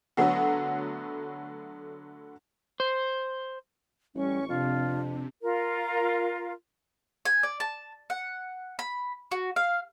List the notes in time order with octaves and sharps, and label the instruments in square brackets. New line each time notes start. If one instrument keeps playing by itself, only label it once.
[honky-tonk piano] D3 F#3 A3 B3 F#4
[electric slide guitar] C5
[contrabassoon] A1 [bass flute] G3 [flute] C#4 [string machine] C#6
[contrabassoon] F2 [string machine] C3 [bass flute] D4 [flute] F4
[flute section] F4 A#4
[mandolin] G#5
D5
A5
F#5
B5
F#4
F5